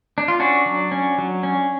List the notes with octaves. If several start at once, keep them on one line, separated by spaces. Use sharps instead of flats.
D4
F4
C#4 D4 F#4
F#3
C#4
F#3
C#4